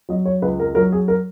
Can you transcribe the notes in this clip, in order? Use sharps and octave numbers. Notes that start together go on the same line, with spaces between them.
F#3 D#5
C#5
C#2 B4
A#4
F#3 A#4
G#4
A#4